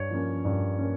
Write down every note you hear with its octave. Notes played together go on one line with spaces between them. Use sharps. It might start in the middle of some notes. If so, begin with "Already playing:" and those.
Already playing: G2 C#5
F3 A#3 C#4
G2
A#3 C#4